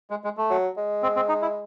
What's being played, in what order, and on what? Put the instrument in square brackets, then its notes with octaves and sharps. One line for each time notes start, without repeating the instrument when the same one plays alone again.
[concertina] G#3
G#3
A3
[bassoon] F#3
G#3
[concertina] C4
C4
D#4
E4